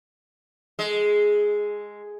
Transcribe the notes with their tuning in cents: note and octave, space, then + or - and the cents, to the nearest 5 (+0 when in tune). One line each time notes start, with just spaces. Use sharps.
G#3 +0 A4 +20 D#5 +25